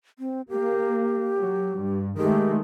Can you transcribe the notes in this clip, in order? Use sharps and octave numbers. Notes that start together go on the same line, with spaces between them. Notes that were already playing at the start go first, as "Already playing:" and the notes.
C4
A#3 G4
F#3
G2
D#3 G#3 A3 G4